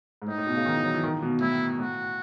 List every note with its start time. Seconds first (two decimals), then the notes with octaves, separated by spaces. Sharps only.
0.22 G#2
0.27 A2 D#4
0.38 A2
0.47 B2
0.56 C#3
0.66 D#3
0.75 E3
0.85 F#3
0.94 E3
1.04 D#3
1.22 B2
1.41 A2 E4
1.79 A2 F#4